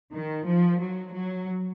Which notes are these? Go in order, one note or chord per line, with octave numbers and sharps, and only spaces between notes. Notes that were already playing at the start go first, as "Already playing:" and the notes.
D#3
F3
F#3
F#3